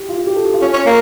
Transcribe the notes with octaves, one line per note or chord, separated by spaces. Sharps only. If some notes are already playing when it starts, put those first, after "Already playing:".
Already playing: G4
F4
G4
A4
G4
F4
C#4
C#4
A#3